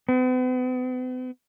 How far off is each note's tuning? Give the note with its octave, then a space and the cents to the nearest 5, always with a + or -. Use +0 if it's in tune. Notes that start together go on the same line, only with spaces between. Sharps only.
B3 +45